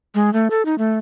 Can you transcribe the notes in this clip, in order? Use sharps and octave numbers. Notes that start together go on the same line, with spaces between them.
G#3
A3
A4
D#4
A3